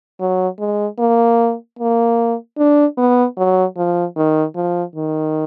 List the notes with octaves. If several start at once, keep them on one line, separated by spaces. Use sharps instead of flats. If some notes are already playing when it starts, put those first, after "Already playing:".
F#3
G#3
A#3
A#3
D4
B3
F#3
F3
D#3
F3
D#3